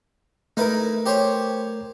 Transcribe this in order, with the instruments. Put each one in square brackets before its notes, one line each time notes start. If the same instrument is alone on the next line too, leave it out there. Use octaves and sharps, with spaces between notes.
[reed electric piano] A3 A#4 [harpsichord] D#4 E4 B4
[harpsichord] G4 C5 C#5